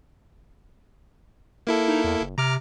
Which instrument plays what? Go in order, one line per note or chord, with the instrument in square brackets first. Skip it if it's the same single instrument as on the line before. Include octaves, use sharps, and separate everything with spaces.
[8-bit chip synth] A#3 E4 A4
[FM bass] D#4
E2
F#1
[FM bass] C3 [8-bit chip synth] A#5 D6 F6